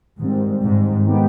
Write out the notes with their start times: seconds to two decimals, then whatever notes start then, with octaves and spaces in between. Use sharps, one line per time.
0.19 G#2 D#3 G3 C4
0.63 G#2
1.06 D#3 G#3 B3 D#4 G4